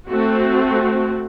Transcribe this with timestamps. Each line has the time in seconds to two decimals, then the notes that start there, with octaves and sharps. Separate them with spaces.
0.10 A3 C4 F#4